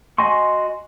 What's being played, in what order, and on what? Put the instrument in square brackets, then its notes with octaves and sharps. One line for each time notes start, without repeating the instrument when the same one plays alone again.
[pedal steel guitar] F#4 D#5 G#5 C6 C#6